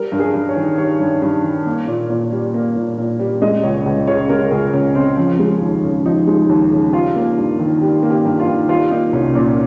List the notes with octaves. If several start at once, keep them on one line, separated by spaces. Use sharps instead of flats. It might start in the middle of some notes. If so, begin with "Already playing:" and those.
Already playing: G3 A#4
G2
G#4
G2
C#5
D#3
G3 C#5
G2
G2
D#3
A#3
A#2
A#2
G3
A#3
A#2
A#2
G3
G#3 D#5
C#2 C#5
C#2
C#3 C#5
G#3 A#4
C#2 G#4
C#2 C#4
C#3 C4
F3 C#4
G#3
D#2
C#3
F3 D#4
G#3
D#2
C#3
G3 F4
A#3
G2
D#3
G3 G4
A#3
G4
G2
F4
D#3
G3 F4
A#3 D#4
C2 C#4
A#2 C#4